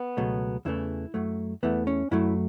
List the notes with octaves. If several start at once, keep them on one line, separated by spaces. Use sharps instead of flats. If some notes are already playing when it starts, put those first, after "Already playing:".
Already playing: B3
C#2 B2 F#3 A3
E2 C#3 E3 A3 E4
F#2 F#3 A3
E2 E3 A3 B3
C#4
F#2 F#3 A3 E4